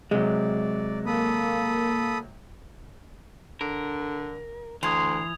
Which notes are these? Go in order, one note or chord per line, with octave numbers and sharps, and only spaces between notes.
C3 F#3 G#3 D5
A#3 A4 B5 D#6
D3 A#4
D2 E3 C6 D#6 G#6 F7